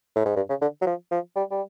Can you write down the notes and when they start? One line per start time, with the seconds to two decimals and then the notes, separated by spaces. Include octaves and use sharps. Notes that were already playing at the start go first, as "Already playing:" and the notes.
0.16 A2
0.26 G#2
0.36 G2
0.49 C#3
0.61 D3
0.81 F#3
0.87 F3
1.11 F3
1.36 G3
1.51 G3